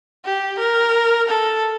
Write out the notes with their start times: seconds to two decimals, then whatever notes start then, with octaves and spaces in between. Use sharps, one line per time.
0.25 G4
0.59 A#4
1.29 A4